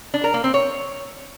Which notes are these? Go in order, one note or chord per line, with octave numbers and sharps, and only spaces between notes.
D4
A#4
A#3
C4
C#5